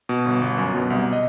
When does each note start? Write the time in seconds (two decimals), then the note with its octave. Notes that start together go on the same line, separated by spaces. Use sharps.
0.09 B2
0.25 G1
0.42 G1
0.58 F#2
0.74 B2
0.90 C2
1.13 D#5